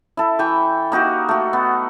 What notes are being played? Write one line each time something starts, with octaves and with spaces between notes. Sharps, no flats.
E4 A4
E3 G5 C#6
A#3 D#4 F#4 G4
A3 F#4
B3